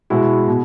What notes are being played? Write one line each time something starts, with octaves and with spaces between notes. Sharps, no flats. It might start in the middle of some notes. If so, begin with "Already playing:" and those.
B2 G#3 B3 E4 F#4
B2